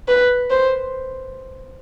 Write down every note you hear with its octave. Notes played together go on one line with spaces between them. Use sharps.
B4
C5